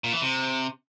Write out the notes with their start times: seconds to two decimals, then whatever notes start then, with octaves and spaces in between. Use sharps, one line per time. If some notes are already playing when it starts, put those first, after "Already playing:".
0.04 A#2
0.13 E3
0.22 C3